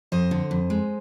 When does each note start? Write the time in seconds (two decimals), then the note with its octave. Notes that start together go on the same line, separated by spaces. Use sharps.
0.12 F2 C5 D#5
0.31 D3
0.51 F2
0.70 G#3